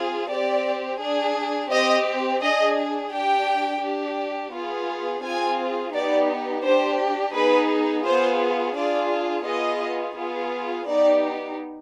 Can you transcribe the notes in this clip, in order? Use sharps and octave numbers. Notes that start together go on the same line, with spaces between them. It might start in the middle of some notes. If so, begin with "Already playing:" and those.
Already playing: C4 F4 G#4
C4 G4 D5
D4 G#4
C4 G4 D#5
D4 G#4 D#5
D4 G4 G5
D4 G4
B3 F4 G#4
C4 F4 G#4 G#5
B3 D#4 G4 D5
D4 G4 C5
B3 D#4 G#4 B4
B3 F4 G#4 C5
D4 F4 G#4 D5
B3 F4 G#4 D#5
B3 F4 G#4
B3 D#4 G4 D5